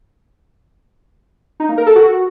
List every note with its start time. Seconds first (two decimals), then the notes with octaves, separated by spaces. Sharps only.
1.60 D#4
1.69 A#3
1.78 A#4
1.87 A4
1.95 F#4